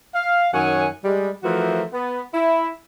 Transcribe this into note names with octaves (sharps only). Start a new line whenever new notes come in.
F5
F#2 D#3 C#5 F#5 G#5
G3 G#3
E3 F3 A3 F#4 A#4 C5
B3
E4